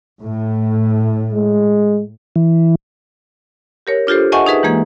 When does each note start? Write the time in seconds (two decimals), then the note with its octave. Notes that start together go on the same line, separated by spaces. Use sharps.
0.22 A2
1.31 G#3
2.36 E3
3.87 G4 A#4 C#5
4.07 D4 F4 G4 A4 C5
4.32 D#5 E5 F#5 G#5 A5 C#6
4.46 D#4 G#4 B4 E5
4.63 E3 G#3 A#3 G#6